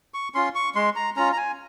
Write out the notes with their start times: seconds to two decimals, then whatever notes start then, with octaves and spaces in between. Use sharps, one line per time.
0.14 C#6
0.35 C#4 F4 C6
0.55 C#6
0.75 G#3 C6
0.96 A#5
1.16 C#4 F4 A#5
1.33 A#5
1.37 G#5